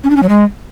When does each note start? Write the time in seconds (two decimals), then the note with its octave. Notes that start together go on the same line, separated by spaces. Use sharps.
0.04 C#4
0.10 D4
0.16 C#4
0.23 F#3
0.29 G#3